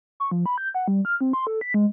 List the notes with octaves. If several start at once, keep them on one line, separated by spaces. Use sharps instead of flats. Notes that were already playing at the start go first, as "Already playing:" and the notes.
C#6
F3
B5
G6
F#5
G3
F6
C4
C6
A4
B6
G#3